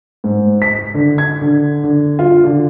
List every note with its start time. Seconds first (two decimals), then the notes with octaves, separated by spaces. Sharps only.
0.24 G#2
0.62 B6
0.94 D3
1.18 G#6
1.41 D3
1.84 D3
2.19 F4
2.44 D3